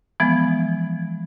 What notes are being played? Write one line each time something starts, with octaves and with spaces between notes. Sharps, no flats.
E3 F3 G#3 B3